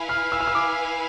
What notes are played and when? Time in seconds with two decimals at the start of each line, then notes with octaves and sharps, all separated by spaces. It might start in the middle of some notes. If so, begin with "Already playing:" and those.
Already playing: E4 B4 F5 G#5
0.09 F6
0.32 E6
0.40 F6
0.47 E6
0.55 D6